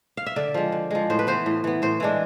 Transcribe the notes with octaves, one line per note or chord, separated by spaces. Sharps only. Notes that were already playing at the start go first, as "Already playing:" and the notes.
F5
E5
D3 D5
F3 G#3
D3
F3 G#3
A2 C5
B4
E3 B3 C5
A2
E3 B3
A2 C5
E3 G#3 D4